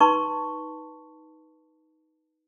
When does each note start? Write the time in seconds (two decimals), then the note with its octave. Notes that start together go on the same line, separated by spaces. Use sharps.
0.01 D#4 B4 A5 C6 C#6